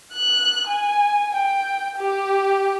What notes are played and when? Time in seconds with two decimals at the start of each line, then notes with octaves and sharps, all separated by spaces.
0.13 F#6
0.68 G#5
1.33 G5
1.98 G4